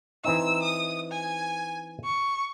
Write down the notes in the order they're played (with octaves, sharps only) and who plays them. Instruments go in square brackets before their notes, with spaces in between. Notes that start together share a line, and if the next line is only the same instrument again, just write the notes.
[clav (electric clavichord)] E3 C4 D#4 [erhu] E6
[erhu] D#6
G#5
C#6